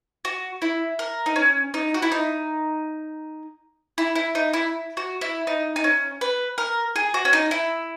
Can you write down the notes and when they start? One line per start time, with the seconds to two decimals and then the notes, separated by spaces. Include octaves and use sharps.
0.25 F#4
0.62 E4
0.99 A#4
1.26 D#4
1.36 C#4
1.74 D#4
1.94 F#4
2.02 E4
2.12 D#4
3.98 E4
4.15 E4
4.35 D#4
4.53 E4
4.97 F#4
5.21 E4
5.47 D#4
5.76 D#4
5.84 C#4
6.21 B4
6.58 A#4
6.96 G#4
7.14 F#4
7.25 C#4
7.33 D#4
7.51 E4